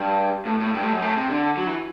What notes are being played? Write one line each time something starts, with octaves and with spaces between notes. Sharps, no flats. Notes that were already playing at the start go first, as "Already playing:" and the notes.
Already playing: G2
A2
A2
G2
A2
F#2
A2
C3
D3
F#3
E3